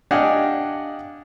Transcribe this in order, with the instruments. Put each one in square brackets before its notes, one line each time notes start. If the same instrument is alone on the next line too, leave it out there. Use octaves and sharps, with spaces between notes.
[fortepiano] D4 G4 D#5 F5 F#5 G#5